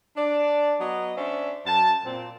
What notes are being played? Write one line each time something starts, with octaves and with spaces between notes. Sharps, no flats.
D4 D5
F#3 B3 D#5
C#4 D4 C5 D5 E5
F#2 A5
A#2 C4